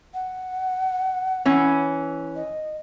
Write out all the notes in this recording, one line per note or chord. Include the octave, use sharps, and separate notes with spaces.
F#5
E3 C#4
D#5